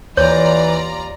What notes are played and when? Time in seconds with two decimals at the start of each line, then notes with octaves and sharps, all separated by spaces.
0.17 D#2 E3 F4 C#5 D5 A#5